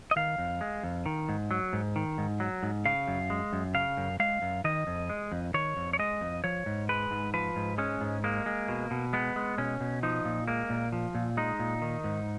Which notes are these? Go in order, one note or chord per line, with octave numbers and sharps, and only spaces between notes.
D#5
D#3 F5
F2
G#3
F2
D#3
G#2
F#3
G#2
D#3
G#2
F#3
G#2
C#3 F5
F#2
G#3
F#2
C#3 F5
F#2
G#3 F5
F#2
D#3 D#5
F2
G#3
F2
D#3 C#5
F2
C#5
G#3 D#5
F2
F3 C#5
G#2
G#3 B4
G#2
F3 B4
G#2
G#3 C#4
G#2
G#3 A#3
G#3
B2
B2
G#3 B3
G#3
B2 C#4
B2
F3 D#4
A#2
G#3 A#3
A#2
F3
A#2
G#3 D#4
A#2
D#3
G#2